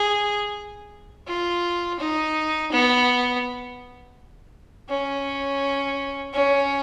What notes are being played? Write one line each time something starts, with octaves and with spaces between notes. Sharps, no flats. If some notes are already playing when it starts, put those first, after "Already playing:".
Already playing: G#4
F4
D#4
B3
C#4
C#4